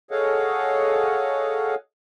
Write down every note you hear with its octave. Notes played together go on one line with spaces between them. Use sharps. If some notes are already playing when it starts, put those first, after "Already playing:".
G#4 A4 C#5 D#5 F5 F#5